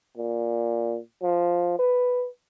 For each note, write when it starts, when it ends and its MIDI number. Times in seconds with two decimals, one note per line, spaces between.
0.17 0.98 46
1.23 1.75 53
1.79 2.27 71